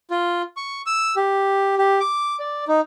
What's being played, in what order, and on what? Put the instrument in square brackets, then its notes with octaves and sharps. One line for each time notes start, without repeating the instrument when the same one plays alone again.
[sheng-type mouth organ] F4
C#6
E6
G4
G4
D6
D5
D#4